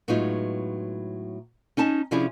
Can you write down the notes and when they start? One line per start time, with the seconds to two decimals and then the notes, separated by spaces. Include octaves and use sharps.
0.08 A2 F#3 G#3 B3 D#4 F4
1.77 C#4 D#4 G#5 A5
2.11 C3 F3 C#4 D4 E4 G#4